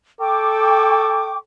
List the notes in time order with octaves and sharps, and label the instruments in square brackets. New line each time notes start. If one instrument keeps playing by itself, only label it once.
[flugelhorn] A4 [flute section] G5 C#6 D6